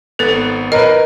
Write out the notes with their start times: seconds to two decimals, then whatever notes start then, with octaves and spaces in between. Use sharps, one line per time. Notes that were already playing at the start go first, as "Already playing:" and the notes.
0.19 G#1 B3 A4 A6
0.72 A#4 B4 D#5